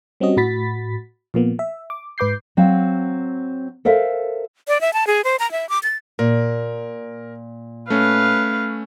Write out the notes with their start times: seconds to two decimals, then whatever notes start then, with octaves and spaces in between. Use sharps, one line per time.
0.20 G3 C4 C#4 F#4 D#5
0.37 A2 F#4 B5 A6 B6
1.34 A#2 F3 A#3 B3
1.59 E5
1.90 D6
2.18 G#2 B4 D6 G6 C7
2.57 F#3 C4 F5
3.85 A4 A#4 C5 E5 F5
4.68 D5
4.81 E5
4.93 A5
5.07 G#4
5.24 C5
5.39 A#5
5.52 E5
5.69 D6
5.83 A6
6.19 A#2 A#4
7.90 A3 C#4 B4 F5